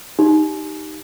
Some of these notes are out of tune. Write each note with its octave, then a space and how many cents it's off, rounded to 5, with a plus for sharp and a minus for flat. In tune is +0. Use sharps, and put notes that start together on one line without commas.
D#4 +0 G4 -5